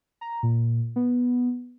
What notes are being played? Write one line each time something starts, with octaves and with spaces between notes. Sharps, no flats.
A#5
A#2
B3